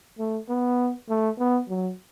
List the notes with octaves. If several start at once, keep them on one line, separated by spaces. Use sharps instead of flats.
A3
B3
A3
B3
F#3